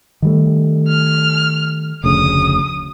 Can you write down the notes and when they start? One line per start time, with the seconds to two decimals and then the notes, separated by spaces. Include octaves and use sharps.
0.22 D#3 G3 A3
0.88 F6
2.04 F1 D2 C#3 D#6